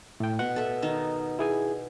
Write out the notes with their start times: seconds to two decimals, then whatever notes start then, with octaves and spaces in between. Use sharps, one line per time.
0.20 A2 G5
0.39 B2 F#5
0.56 A4 E5
0.82 D#3 D#4 A5
1.39 E4 G#4 G#5